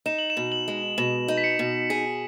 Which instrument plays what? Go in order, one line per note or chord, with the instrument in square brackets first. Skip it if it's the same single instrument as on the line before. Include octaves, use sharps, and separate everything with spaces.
[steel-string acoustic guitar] D#4 [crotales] E7
[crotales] F#7
E7
[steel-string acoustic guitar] B2
[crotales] F#7
[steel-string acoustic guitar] G#3
[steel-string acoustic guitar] B2 [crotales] E7
[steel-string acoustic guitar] D#4
[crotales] B6
C#7
[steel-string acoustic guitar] B2
[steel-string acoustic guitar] G#4 [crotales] B6